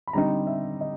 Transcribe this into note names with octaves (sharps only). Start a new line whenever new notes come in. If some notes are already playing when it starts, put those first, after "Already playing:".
B5
D3 G3 C4 D#4 A#5
E5
D#5